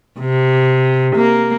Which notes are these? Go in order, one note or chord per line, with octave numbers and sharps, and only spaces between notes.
C3
A#3